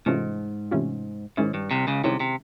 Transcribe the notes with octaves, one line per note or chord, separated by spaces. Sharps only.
G#2 C3 E3 A3 C#4 F4
C3 E3 A3 C#4 F4
G#2 D#3 G#3 C#4 E4
G2
C2 C3
C#2 C#3
C2 C3 D#3 G#3 C#4 E4
C3